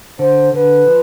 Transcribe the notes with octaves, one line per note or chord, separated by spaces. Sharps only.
D3 C5
D3 B4
F3